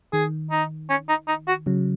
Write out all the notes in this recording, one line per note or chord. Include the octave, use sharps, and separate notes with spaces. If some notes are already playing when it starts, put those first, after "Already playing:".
D#3 G#4
D#4
C#4
D#4
D#4
F#4
C#3 F#3